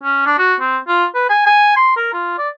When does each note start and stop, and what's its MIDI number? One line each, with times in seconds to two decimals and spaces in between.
0.03 0.22 61
0.26 0.38 62
0.38 0.55 66
0.60 0.77 60
0.88 1.05 65
1.15 1.25 71
1.29 1.44 80
1.46 1.71 80
1.76 1.91 84
1.96 2.11 70
2.13 2.37 65
2.38 2.49 74